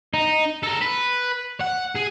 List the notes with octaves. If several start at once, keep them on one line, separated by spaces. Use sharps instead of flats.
D#4
A4 A#4
B4
F#5
G#4